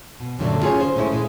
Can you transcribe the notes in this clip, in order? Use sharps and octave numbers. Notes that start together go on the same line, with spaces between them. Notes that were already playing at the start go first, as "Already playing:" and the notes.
B2
F#2 A#2 D3 F#3 A3 D4
C#4 F4 G#4 B4 C#5 G#5
C5
G#3 A3 C#4 E4
A#2 G#3